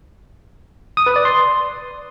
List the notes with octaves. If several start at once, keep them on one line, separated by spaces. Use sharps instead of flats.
D#6
B4
D5
C6